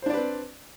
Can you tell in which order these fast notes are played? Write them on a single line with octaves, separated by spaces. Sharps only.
C5 D4 D5 B4 C4